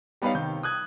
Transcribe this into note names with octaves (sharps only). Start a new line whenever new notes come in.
G3 B3 D#4 B4 C#5 F5
C3 D#3 G6
D#6 F#6 G#6